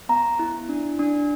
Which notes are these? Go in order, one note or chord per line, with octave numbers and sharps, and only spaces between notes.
B3 A#5
E4
D4
D4